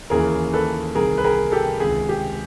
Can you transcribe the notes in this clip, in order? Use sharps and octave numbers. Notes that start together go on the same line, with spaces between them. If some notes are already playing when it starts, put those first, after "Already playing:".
D#2 C#3 E3 G#4 A#4
A4 B4
C2 C3 D#3 G#4 A#4
B4
G#4 A#4
G4 A4
C#2 C3 D#3 G#4
G4